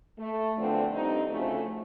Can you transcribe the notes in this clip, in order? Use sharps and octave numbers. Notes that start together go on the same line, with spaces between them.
A3
E2 D3 F3 A3 C4 D4
G2 C4 D#4
D2 C#3 F3 A3